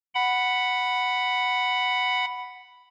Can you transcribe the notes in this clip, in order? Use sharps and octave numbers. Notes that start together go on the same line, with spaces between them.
F#5 B5